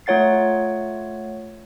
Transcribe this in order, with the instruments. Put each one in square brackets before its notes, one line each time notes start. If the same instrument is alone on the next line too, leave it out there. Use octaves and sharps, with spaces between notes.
[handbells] A3 F4 C#5 F#5 A6 C7